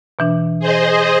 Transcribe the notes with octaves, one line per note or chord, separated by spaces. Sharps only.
B2 E3 D4
G#4 C5 D#5